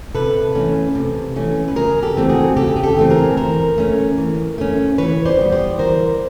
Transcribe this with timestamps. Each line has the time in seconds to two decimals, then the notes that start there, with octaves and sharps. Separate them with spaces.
0.14 C3 A4 B4
0.55 E3 A3 C#4
0.95 C3
1.36 E3 A3 C#4
1.68 B4
1.76 C#3 G#4 A#4
2.03 G4 A4
2.16 E3 A3 C4
2.30 F#4 G#4
2.57 C#3 G4 A4
2.76 G#4
2.83 G4 A4
2.97 E3 A3 C4
3.10 G#4 A#4
3.37 E3 A#4 C5
3.78 A3 C#4
4.18 E3
4.58 A3 C#4
4.98 E3 B4 C#5
5.25 C5 D5
5.39 G3 B3
5.52 C5 D5
5.79 E3 A#4 C5